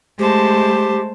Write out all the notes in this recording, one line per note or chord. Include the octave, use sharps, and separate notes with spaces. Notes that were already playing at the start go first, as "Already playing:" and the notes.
G#3 A3 G4 C5 A5